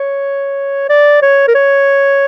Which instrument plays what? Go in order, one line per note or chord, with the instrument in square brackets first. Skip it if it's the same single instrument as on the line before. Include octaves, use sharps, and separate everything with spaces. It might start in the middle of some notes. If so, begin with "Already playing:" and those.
Already playing: [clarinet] C#5
D5
C#5
A#4
C#5